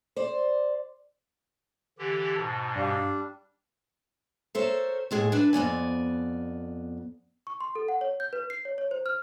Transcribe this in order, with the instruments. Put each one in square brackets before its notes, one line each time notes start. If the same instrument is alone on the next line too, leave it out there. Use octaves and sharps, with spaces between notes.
[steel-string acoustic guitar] C5 D5
[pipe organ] D3 E3 G4
[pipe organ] G#2 B2 [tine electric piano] A5
[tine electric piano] G2 F5 C7 [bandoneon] G3 D4
[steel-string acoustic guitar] A4 A#4 C5 C#5 E5
A2 G#3 G#4
D4 B4 E5
F2 B3 D5 G#5
[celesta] C#6
C6
A4
F#5
C#5
G6
B4
C7
C#5
C#5
C5
F6